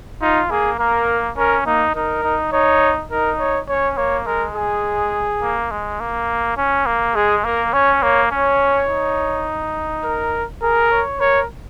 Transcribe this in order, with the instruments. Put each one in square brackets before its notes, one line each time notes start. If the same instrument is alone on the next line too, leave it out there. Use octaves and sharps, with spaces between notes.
[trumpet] D#4 [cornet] F4
[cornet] A#3 [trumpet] G#4
[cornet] A#3 [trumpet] A#4
[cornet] C#4 [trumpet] A#4
[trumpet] A#3 [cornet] D#4
[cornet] D#4 [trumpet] A#4
[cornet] D#4
[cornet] D#4 [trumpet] C#5
[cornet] D#4 [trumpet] A#4
[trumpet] C#5
[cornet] C#4 [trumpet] C#5
[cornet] A#3 [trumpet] C#5
[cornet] G#3 [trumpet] A#4
[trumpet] G#4
[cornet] A#3
G#3
A#3
C#4
A#3
[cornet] G#3 [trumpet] G#4
[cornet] A#3 [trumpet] A#4
[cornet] C#4 [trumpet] C#5
[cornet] A#3 [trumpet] C#5
[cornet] C#4 [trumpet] C#5
[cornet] D#4
[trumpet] A#4
[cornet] G#4 [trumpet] A#4
[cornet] C#5
[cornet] A#4 [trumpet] C#5